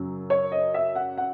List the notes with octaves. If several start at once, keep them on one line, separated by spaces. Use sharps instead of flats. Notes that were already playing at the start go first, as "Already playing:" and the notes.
Already playing: F#2 C#3 F#3
C#5
D#5
E5
F#5
F#5